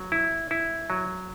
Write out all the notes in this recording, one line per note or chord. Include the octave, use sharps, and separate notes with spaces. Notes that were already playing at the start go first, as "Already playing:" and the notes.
Already playing: F#3
E4
E4
F#3